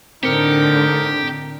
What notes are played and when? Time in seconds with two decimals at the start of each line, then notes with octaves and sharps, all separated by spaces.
0.23 A2 D3 C4 D#4 G4 A#4 C#7